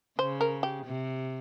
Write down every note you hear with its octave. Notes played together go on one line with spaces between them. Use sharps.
C#3 C5
A#4
G4
C3